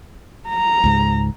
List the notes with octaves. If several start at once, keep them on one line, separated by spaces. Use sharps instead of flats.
A#5
C#2 G#2